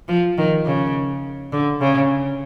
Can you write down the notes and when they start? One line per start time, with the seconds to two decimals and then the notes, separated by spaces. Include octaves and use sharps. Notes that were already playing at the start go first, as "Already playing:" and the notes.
0.08 F3
0.38 D#3
0.65 C#3
1.53 D3
1.80 C#3